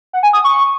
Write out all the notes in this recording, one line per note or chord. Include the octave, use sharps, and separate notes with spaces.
F#5
G#5
D#6
C#6